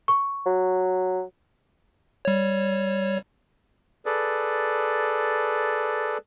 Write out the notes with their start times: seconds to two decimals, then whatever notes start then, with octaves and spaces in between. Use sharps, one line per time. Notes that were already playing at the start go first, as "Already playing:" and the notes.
0.08 C#6
0.46 F#3
2.25 G3 C#5
4.06 G#4 A4 B4 D5